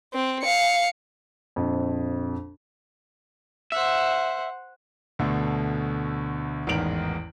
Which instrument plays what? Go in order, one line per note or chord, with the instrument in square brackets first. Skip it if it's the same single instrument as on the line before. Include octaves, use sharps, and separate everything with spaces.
[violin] C4
F5 C#7
[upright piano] A#1 F2
[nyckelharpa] C5 F#5 [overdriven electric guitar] E5
[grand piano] D2 B2 D3 A3
A1 E2 G#2 D#3 D7 F#7